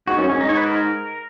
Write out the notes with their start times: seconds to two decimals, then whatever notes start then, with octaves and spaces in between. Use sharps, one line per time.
0.08 G#2 F#4
0.18 F#2 C#4
0.29 G#2 C#4
0.41 D#4
0.49 C#5
0.57 B4
0.66 A#4